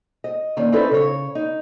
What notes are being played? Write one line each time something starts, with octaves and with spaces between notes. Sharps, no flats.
D#5
D3 D#3 A#3 C#4
C4 C#4 D#4 E4 A4 B4
C#3 C#5
D#4